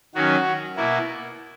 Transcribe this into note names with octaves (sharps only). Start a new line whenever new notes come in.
D#3 F#3 C#4 F#4
B2 A#3 E4